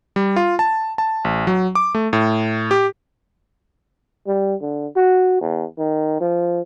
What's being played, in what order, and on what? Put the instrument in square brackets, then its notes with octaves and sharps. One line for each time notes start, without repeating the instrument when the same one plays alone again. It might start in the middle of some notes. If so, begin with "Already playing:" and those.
[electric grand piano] G3
F4
A5
A5
A1
F#3
D6
A3
A2
G4
[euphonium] G3
D3
F#4
E2
D#3
F3